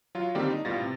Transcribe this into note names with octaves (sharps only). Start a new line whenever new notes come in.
F#3 F4
D3 D#3 G3 A#3 C4 G4
D4 D#4
A2 G3 B3 F4 A6 A#6
C3